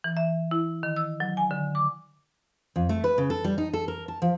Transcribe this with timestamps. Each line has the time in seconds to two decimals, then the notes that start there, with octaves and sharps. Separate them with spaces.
0.04 E3
0.17 E5
0.51 E4
0.83 D#3
0.96 E6
1.20 F#3
1.37 G#5
1.51 D3
1.75 D6
2.76 F2
2.89 A3
3.04 B4
3.18 C#3
3.30 A4
3.44 G3
3.58 D#4
3.73 A4
3.88 A#4
4.08 A5
4.22 F3